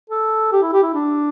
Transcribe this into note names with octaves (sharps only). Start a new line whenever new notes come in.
A4
G4
E4
G4
E4
D4